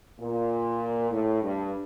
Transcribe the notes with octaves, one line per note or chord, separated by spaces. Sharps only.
A#2
A2
G2